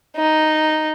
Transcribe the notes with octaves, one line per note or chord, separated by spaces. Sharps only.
D#4